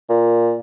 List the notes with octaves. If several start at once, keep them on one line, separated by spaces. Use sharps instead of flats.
A#2